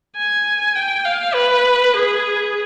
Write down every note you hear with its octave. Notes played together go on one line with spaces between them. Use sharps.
G#5
G5
F5
B4
G#4